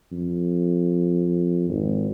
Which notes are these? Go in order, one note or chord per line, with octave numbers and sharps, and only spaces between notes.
F2
G#1